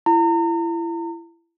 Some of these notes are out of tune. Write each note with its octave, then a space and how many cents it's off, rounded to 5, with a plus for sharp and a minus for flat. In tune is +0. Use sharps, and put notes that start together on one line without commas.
E4 +30 A#5 -35